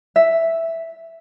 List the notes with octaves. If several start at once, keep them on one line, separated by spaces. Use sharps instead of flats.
E5